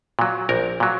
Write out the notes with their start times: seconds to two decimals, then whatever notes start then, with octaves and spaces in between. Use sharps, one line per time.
0.19 A#2 F#3
0.49 A#1 A#4
0.80 A#2 F#3